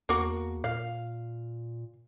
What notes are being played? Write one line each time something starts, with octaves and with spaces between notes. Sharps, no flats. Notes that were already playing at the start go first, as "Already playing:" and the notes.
E2 A#3 F#4
A#2 F5